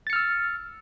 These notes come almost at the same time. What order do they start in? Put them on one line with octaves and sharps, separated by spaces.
A6 C#7 F6 E6